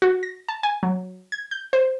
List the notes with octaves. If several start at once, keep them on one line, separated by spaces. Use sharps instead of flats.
F#4
A#6
A5
G#5
F#3
G#6
G6
C5